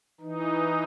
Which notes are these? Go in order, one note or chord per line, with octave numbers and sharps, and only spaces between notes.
E3 D#4